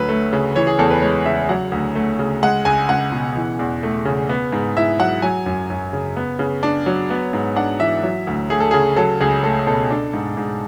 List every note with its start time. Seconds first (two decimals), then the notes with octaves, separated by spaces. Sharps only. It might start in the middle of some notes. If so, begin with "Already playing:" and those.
Already playing: D2 F#3 B4
0.09 A3
0.33 C#3
0.55 E3 C#5
0.67 G#4
0.79 E2 A4
0.91 B4
1.02 G#3 C#5
1.25 C#3 E5
1.49 F#3 F#5
1.72 D2
1.95 A3
2.19 C#3
2.43 G#3 F#5
2.65 C#2 G#5
2.89 C#2 F#5
3.12 B2
3.36 E3
3.59 E2
3.83 A3
4.05 C#3
4.29 B3
4.52 G#2
4.77 E4 E5
4.99 F#3 F#5
5.22 F#3 G#5
5.46 F#2
5.70 F#2
5.93 C#3
6.17 B3
6.39 C#3
6.63 D4
6.86 F#3
7.10 B3
7.33 G#2
7.56 D4 F#5
7.80 E3 E5
8.03 F#3
8.27 D2
8.50 A3 G#4
8.60 A4
8.71 C#3 G#4
8.96 F#3 A4
9.21 C#2 G#4
9.43 A3 A4
9.67 B2 A4
9.90 D4
10.14 G#2
10.37 G#2